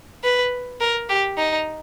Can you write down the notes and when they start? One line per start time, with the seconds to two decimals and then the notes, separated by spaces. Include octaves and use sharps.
0.24 B4
0.81 A#4
1.09 G4
1.38 D#4